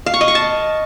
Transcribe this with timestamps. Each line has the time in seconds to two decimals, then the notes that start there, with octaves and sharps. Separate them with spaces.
0.06 F5
0.14 C#6
0.21 D#5
0.28 C#6
0.35 A5